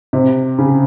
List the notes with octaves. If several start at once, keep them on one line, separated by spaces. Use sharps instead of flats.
C3
C#3